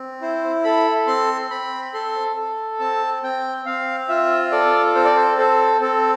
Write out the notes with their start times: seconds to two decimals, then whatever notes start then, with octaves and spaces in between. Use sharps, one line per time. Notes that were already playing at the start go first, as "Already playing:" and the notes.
Already playing: C4
0.21 E4 C5
0.64 A4 B5
1.07 C4 C6
1.50 C4 B5
1.94 A4 C6
2.36 A4
2.79 C4 A5
3.23 C4 G5
3.65 C4 F5
4.08 F4 E5
4.52 A4 D5
4.95 C4 C5
5.05 D5
5.16 C5
5.38 A4 C5
5.81 C4 A4